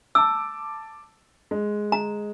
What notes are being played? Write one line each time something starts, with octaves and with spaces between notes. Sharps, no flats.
A5 D6 E6
G#3
A#5